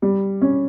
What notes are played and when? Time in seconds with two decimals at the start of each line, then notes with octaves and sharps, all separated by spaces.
0.02 G3
0.41 C#4